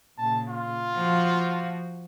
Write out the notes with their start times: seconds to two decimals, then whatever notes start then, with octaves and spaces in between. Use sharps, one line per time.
0.18 A#2 C#3 A5
0.49 F4
0.94 F3 F#4